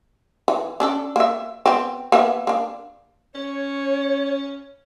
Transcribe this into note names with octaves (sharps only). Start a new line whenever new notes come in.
E3
C#4 D4 A4
A#3 E5
B3 C4
A#3 B3 E5
A#3 D4
C#4 C#5